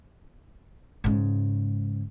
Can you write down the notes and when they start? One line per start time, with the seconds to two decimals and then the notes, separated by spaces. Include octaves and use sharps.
1.04 G#2 C#3